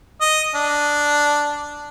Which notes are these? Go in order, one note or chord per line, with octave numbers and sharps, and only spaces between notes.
D#5
D4